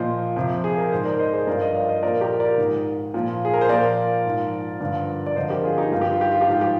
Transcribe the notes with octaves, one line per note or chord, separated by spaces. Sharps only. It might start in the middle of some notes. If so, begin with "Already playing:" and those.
Already playing: A#2 F3 C5 D#5
F2 C3 F3
G#4
A#4
G#2 D#3 C5
A#4 D5
C5 D#5
G#4 C5
G2 F3 A#4 D5
C5 D#5
D5 F5
C5 D#5
A#2 F3 A#4 D5
G4 A#4
A#4 D5
G#2 D#3
A#2 F3
G#4
A#4
C5
A#2 F3 A#4 D5
G#2 F3
G2 D3 F3
D5
F2 D3 F3 C5 D#5
G4 A#4
F4 G#4
D#4 G4
G2 D#3 F4
G4
F4
G4
F4
G4
G#2 F3 F4
G4